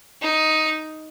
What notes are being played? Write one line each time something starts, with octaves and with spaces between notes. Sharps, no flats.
D#4